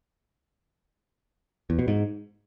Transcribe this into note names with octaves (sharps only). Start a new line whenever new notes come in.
E2
B2
G#2